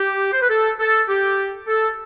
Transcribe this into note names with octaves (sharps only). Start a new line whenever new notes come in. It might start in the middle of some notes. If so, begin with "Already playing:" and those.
Already playing: G4
C5
B4
A4
A4
G4
A4